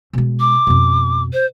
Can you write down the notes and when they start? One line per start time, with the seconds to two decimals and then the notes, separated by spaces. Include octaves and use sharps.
0.13 B2 G#3
0.40 D6
0.67 F2 B2
1.33 C5